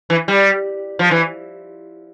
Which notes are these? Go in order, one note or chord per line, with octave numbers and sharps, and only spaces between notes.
E3
G3
F3
E3